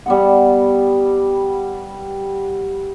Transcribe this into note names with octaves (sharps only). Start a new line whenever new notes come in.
G3 B3 F#5